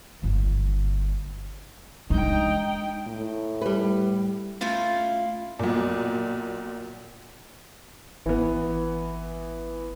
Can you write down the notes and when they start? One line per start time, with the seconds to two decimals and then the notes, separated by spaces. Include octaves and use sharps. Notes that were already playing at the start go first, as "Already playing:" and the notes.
0.22 G1 A#3
2.10 G#3 D4 D#4 G5
3.08 A2
3.62 G3 B4
4.61 A3 C#4 E4 F4 F5
5.59 B1 A#2
8.26 G#1 E3 B3